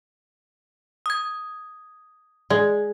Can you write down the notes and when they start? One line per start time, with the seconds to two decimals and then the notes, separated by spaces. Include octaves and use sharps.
1.06 D#6 G#6
2.50 G#3 D5